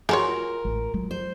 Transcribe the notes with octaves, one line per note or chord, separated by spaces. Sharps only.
G#3 F#4 A#4 C#5 G#5 C6
F4
A1
F#3
C5